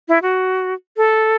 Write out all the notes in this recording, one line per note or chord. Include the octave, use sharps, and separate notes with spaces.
E4
F#4
A4